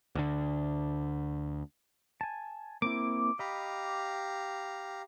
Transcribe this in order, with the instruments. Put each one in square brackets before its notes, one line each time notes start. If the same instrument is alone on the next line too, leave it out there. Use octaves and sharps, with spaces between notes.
[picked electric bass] D2 D3
[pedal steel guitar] G#5 A5
[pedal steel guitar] A#3 C4 E4 [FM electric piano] D6
[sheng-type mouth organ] G4 F5 A#5 [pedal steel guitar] D#5 B5